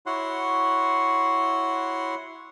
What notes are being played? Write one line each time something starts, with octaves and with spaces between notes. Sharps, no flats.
E4 F#4 C#5 F#5 C6